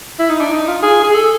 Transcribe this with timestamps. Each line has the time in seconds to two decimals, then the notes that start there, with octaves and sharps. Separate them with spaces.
0.19 E4
0.30 D#4
0.41 D4
0.52 D#4
0.68 F4
0.83 G#4
1.04 G#4
1.15 A4